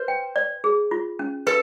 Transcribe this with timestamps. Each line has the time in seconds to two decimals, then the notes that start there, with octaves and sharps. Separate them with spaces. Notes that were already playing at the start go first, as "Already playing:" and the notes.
Already playing: B4 C5
0.08 G5
0.36 D5
0.64 G#4
0.91 F4
1.19 C#4
1.47 A4 B4